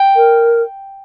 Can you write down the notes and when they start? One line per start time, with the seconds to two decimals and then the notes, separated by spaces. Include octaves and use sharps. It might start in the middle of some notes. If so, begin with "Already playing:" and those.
Already playing: G5
0.16 A#4